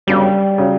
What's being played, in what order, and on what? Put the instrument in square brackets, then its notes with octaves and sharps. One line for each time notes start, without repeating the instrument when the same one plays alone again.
[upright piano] G1 F#2 C#3 F#3 [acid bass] G3
[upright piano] C#3 F#3